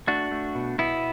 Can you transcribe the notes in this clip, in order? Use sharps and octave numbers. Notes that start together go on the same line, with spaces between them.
A3 D4 F#4
A3
B2
B2 B3 E4